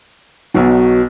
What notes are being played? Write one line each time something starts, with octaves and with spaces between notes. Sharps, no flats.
B1 B2 F#3